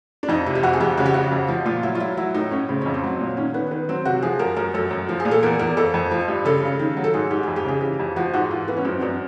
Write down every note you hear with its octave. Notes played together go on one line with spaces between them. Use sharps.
D4
F2 D#4
C3 E4
G4
F2 F#4
G#4
F2 G4
C#3 F#4
G4
C#3 F#4
F2
F3
A#2 F4
F#3 E4
F4
F#3 E4
F#3 E4
A2 D#4
A2 C#4
C#3 C4
F2 C#4
C4
F#3
A#2
D#3 C#4
D#3 B3
D#3 B3
F#3 C4
C3 F#4
F3 G#4
F#2 A#4
F#2 A#4
F#2 A4
F#2
F3
G#4
A#2
A4
E2 A#4
E2 A#4
F2 A4
F2
F3
G2
C#3 A4
C#3
D#3
F#3
A4
G#2 G#4
G#2 G4
F2 G#4
G4
C#3 G#4
E3 G4
F2
F3 F#4
G#2 F#4
E3 F4
E3 B3
C#4
F#2 C4
F#2 D4